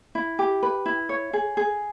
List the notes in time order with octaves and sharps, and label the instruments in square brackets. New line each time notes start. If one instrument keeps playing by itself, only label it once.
[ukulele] E4
G4
B4
E4
C#5
G#4
G#4